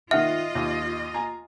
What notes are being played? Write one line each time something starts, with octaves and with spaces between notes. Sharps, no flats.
D#3 F4 D#5 E5 F#5 F6
D#2
G#5 A#5